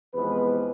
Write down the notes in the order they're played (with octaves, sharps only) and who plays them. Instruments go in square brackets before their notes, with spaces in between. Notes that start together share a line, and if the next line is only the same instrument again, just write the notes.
[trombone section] E2 C3 F3 G#3 B4